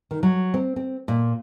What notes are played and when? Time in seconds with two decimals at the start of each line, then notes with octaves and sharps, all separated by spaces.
0.11 D#3
0.23 F#3
0.54 C4
0.76 C4
1.08 A#2